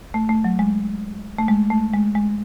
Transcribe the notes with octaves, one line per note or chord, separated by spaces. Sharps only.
A3
A3
F#3
G#3
A3
G#3
A3
G#3
G#3